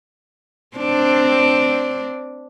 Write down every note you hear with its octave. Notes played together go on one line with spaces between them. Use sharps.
C4 D4